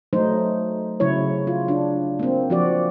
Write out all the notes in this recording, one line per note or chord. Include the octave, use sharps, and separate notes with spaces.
F#3 A3 D#4 C5
C#3 F#3 E4 C#5
F4
D4
A#3 C4
F3 F#4 D5